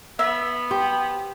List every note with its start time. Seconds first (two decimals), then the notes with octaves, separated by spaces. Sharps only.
0.19 B3 E5
0.71 G4 C5